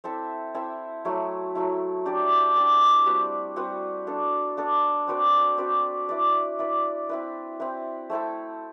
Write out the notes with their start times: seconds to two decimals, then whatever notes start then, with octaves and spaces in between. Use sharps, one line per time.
0.04 C4 E4 A4 E5
0.54 C4 E4 A4 E5
1.05 F#3 A3 E4
1.55 F#3 A3 E4
2.05 D4 G4 D5
2.55 D4 G4 D5
3.06 G3 C4 F#4 B4
3.56 G3 C4 F#4 B4
4.07 B3 D4 A4
4.57 B3 D4 A4
5.07 C4 F#4 B4 D5
5.58 C4 F#4 B4 D5
6.09 E4 B4 D5
6.59 E4 B4 D5
7.09 C4 E4 B4
7.60 C4 E4 B4
8.10 A3 C4 E4 A4